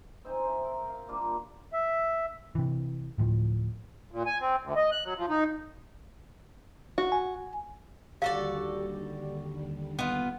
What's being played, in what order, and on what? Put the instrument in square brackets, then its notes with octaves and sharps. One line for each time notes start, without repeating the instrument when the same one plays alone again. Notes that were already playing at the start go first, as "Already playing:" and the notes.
[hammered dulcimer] C4 D#4 C5 G#5
C5 E5
A#4
F5
G3 A#3 D4 F4
[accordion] E5
[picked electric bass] C3 E3
D1 A2 F3
[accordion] A#2
G#5
C4
D2
D#5
F#6
F#3
F3
D#4
[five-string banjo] F#4
[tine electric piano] G#5
[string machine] D#2 D3 G3 [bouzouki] F#4 A4 D5 [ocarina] G4 [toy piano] F5
[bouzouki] B3 F4